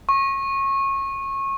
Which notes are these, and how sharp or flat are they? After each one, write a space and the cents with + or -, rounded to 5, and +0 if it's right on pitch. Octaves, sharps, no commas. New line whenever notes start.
C#6 -25